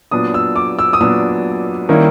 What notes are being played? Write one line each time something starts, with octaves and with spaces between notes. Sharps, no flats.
A#2 F#3 B3 D4 D#6
E6
D6
E6
D#6
A#2 F#3 B3 D4 E6
D#3 G3 A#3 C#4 E4